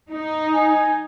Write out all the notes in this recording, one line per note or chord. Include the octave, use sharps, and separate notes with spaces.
D#4
G#5